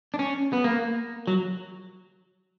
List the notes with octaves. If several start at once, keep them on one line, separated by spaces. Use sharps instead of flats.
D4
C#4
B3
A#3
F#3